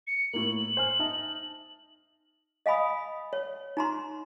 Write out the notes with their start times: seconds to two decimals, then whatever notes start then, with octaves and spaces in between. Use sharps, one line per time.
0.07 C#7
0.33 A2 A#3 F#7
0.59 F#7
0.77 C5 G#5 F6
0.99 D#4 E5 A5
2.66 D#5 F5 G#5 B5 D#6
3.33 C#5
3.77 D#4 A#5 C6